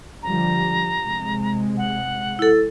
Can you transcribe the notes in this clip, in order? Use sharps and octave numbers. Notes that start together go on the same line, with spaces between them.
D3 F3 G3 A#5
C3 G#3
F#5
E4 A4